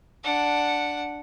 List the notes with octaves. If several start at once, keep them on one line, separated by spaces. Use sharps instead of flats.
D4 F#5